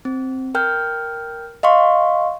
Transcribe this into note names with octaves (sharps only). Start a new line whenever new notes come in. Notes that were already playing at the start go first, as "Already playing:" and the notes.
C4
A#4 G5 F6 G6
D#5 F5 C6 C#6